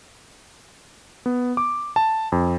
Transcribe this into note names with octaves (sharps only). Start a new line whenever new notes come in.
B3
D6
A5
F2